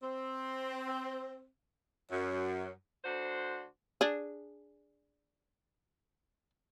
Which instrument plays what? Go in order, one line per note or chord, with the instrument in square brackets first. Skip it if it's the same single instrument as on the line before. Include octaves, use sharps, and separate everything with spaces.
[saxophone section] C4
F#2
D2 D4 F#4 C5
[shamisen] D4 G#4